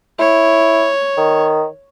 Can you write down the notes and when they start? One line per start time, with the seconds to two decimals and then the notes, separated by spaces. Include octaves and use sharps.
0.19 E4 C#5
1.17 D#3